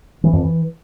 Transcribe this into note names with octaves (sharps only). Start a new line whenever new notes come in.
E3
F2
E3